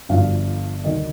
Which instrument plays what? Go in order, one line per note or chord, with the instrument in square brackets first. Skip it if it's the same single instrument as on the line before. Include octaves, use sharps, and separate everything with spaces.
[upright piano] G1 G2 D3 F3 F5
D2 C3 D#3 D#5